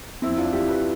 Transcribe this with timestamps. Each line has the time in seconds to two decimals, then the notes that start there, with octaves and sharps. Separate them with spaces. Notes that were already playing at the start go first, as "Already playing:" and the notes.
0.22 F2 C4 E4
0.38 D4 F4
0.52 E3 G3 E4 G4
0.68 G4 B4